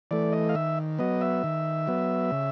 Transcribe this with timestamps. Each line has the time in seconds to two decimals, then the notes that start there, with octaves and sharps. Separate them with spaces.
0.11 E3 A3 D5
0.32 D#5
0.49 F5
0.55 D#3 E5
0.99 F#3 B3 D#5
1.21 E5
1.44 D#3
1.87 F#3 B3
2.32 C#3